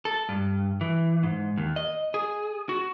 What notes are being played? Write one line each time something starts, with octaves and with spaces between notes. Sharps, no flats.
A4
G2
E3
G#2
D#2
D#5
G#4
F#4